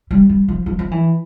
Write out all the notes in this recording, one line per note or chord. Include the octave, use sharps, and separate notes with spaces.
G3
G3
F3
F3
F3
E3